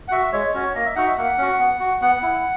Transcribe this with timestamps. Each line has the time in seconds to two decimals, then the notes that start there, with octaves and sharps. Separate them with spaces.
0.08 F#5
0.11 F#4 E5
0.33 G#3 C#5
0.53 C#4 F#4 C#5
0.75 A#3 D#5
0.86 E5
0.96 D#4 F#4 F#5
1.07 E5
1.17 A#3 F#5
1.38 C#4 F#4
1.60 B3
1.80 F#4
2.01 B3 F#5
2.23 E4